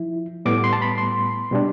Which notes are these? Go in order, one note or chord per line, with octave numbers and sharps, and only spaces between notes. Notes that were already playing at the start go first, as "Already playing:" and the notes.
Already playing: F3 E4
A2 G3 B3 D6
C6
A5
B5
C6
B2 G3 D4